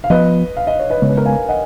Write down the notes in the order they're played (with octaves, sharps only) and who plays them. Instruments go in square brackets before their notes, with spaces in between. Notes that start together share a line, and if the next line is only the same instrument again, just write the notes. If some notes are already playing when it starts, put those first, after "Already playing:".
[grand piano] F5
[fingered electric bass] F3 B3 [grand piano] B4 D#5
[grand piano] F5
D#5
C#5
B4 D#5
[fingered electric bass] C#3 G#3 B3 [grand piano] C#5
[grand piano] B4
A#4 C#5
F5 G#5
D#5 F#5